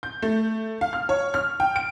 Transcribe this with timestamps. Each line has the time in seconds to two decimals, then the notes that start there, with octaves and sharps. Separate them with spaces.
0.03 G6
0.22 A3
0.81 F5
0.93 F6
1.09 C#5
1.34 F6
1.60 G5
1.76 D7